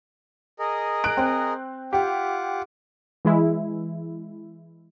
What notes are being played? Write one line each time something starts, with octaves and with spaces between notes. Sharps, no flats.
G#4 A#4 D#5
F#6 D7
C4
F4 G4 F#5 D6
E3 G#3 E4